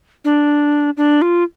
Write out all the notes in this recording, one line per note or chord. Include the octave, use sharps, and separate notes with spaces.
D4
D4
F4